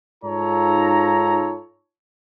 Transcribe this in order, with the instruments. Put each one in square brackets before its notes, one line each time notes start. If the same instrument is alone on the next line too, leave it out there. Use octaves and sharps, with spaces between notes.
[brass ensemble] G#2 D#4 F4 A4 C#5 A#5